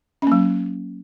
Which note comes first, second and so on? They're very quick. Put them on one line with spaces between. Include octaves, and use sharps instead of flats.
C#4 A#3 F#3